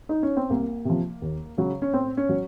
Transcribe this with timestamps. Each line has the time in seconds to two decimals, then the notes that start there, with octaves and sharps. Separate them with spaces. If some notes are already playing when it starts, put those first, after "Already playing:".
0.09 D#4
0.23 C#4
0.37 C4
0.50 C2 A#3
0.85 C3 F3
1.22 D#2
1.58 C#3 F#3
1.82 C#4
1.93 A2 C4
2.17 C#4
2.29 F#3